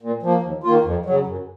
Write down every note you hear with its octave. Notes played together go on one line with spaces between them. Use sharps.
A#2
F3 A#3
D#2
D#3 A#3 F4
F2
C#3 F#3
F#2